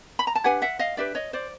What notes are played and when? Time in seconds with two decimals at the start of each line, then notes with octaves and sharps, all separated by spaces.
0.19 B5
0.27 A#5
0.35 A5
0.44 D4 G4 B4 F#5 G#5
0.62 E5 F#5
0.79 D#5 F5
0.97 D4 G4 B4 D5 E5
1.15 C#5 D#5
1.33 C5 D5